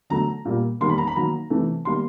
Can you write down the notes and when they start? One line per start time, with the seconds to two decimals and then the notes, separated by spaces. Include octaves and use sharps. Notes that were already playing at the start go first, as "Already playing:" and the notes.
0.10 D3 F#3 A3 A#5
0.45 A#2 G3 A#3
0.80 D#3 G3 A#3 C6
0.89 B5
0.98 A#5
1.07 B5
1.15 D#3 F#3 A#3 A#5
1.50 C3 E3 A3
1.85 D#3 G3 A#3 C6